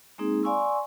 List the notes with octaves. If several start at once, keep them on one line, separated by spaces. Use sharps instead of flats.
G#3 A#3 C4 D#4 G#4
D5 F5 G#5 C6 C#6 E6